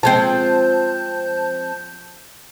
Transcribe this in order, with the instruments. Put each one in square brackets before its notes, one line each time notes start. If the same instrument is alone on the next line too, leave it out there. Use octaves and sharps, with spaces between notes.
[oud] F3 G#3 C4 [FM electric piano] A5 G6